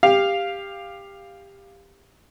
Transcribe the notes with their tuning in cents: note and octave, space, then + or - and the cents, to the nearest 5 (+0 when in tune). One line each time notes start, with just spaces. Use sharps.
G4 +15 F5 +0